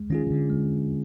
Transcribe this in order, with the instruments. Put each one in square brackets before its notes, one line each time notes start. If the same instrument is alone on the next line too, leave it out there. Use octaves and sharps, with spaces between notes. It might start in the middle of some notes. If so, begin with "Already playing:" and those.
Already playing: [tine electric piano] G#3
[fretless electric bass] D#3 [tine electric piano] C#4 F4 G#4
[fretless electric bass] D#3
D3
[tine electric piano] G#3